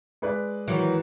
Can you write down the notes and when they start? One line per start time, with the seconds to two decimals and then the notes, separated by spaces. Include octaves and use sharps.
0.22 G#3 B4 D5
0.68 D#3 E3 F#3